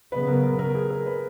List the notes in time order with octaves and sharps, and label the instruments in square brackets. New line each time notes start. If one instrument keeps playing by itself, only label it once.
[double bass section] C#3 F#3 B3 [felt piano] B4
[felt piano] A#4
A#4
A#4
G#4
A#4
B4